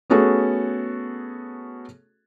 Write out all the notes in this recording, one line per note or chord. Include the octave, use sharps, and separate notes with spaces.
A3 B3 C#4 F#4 G#4 A4